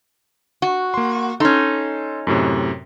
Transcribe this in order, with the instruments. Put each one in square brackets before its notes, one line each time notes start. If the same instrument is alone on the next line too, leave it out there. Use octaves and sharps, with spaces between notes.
[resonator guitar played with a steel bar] F#4
[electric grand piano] A#3 C6
[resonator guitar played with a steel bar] C#4 D#4 [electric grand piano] A4 C6
[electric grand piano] F#2 A2 C3